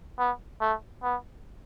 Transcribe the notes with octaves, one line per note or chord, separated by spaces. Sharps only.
B3
A3
B3